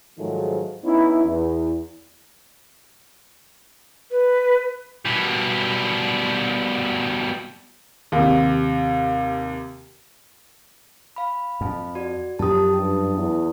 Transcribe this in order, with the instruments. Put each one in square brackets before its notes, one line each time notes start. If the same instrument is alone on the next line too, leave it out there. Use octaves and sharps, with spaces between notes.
[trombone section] G#2 D#3 F3 F#3 G#3 A3
B3 C#4 D#4 E4
E2
[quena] B4
[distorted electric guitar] B2 G3
[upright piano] D#2 C3
[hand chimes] F5 B5
[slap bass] F2
[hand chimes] F#4 D5
[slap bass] F#2 F3 [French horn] G4 [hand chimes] A5 D#6
[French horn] G2
E2